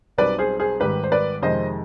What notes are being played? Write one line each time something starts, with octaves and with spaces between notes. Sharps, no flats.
B1 B2 G3 C4 B4 D5
G#4 C5
G#4 C5
G#1 G#2 D#3 G3 G4 B4
C5
B4 D5
F2 C3 D#3 G#3 C5 D#5